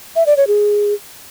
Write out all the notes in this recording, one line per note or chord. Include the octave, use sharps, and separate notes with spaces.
E5
D5
C#5
G#4